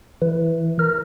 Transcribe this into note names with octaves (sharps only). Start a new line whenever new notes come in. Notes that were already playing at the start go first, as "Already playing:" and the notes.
E3
A#4